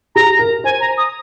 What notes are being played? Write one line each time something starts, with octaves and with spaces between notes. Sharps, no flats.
G#4 A#5
A#4
C5 G#5
A#5
D#6